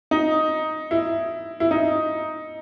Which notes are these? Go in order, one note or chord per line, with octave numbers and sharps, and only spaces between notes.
D#4
E4
E4
D#4